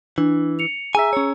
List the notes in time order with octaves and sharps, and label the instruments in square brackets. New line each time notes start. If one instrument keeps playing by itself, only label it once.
[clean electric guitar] E3 [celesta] D4
[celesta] C#7 F7
[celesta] G#4 A#5 E6 [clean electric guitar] E5 G#5
[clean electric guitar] C#4 C#5